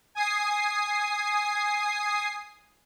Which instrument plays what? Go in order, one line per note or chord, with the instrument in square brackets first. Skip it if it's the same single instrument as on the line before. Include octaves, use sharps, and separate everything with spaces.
[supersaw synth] G#5 D#6 C7